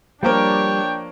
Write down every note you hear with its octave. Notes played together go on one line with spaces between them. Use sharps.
F3 G3 A#3 D4 A#4 C#5 G5 D6